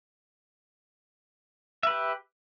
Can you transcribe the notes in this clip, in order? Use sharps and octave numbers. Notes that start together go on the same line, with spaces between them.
G4 B4 E5